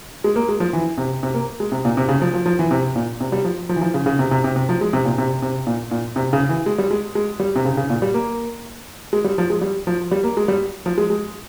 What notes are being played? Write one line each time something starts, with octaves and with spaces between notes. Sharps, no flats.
G#3
A#3
G#3
F3
E3
C3
C3
A#3
G#3
C3
A#2
C3
C#3
F3
F3
F3
E3
C3
A#2
C3
G3
F3
F3
E3
F3
C#3
C#3
C3
C3
C3
C3
F3
G#3
C3
A#2
C3
C3
A#2
A#2
C3
C#3
E3
G#3
G3
G#3
G#3
G3
C3
C#3
C#3
A#2
G3
A#3
G#3
G3
F3
G#3
G3
F3
G3
A#3
G#3
G3
F3
G#3
G#3